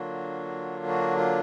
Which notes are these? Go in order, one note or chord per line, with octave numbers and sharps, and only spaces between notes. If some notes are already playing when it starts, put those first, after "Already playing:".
Already playing: D3 F#3 A#3 D4 F4 F#4
F#4
F4